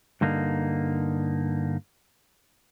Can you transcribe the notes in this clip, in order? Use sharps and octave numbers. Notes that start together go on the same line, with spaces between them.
G2 D3 A#3 D#4